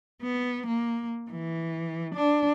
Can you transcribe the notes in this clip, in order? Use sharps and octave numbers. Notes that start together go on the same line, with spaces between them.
B3
A#3
E3
D4